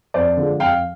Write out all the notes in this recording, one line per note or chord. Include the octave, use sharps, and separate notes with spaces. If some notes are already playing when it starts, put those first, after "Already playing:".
F2 C5 D5
D3 F3 G#3
F2 F5 G5